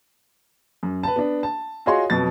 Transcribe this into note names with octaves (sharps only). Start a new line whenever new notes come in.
F#2
B4 A5
B3 D4
A5
F4 F#4 G#4 C#5 D#5 C6
F2 B2 F#3 A6